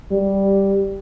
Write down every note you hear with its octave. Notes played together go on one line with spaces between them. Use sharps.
G3